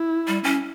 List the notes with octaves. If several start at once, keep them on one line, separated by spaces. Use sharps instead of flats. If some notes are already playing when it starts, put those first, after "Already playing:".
Already playing: E4
G3
C#4